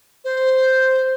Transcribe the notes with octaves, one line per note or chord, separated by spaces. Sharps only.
C5